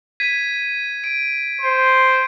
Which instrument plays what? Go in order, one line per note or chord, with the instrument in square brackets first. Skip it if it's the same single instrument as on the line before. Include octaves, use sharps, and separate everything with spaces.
[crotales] G#6 B6 D#7
D7
[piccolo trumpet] C5